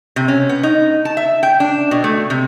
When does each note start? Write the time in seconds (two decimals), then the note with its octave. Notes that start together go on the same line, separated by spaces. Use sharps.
0.16 C3
0.28 C#4
0.49 B3
0.63 D#4
1.05 A5
1.17 E5
1.43 G5
1.60 D4
1.91 B2
2.04 A3
2.30 C3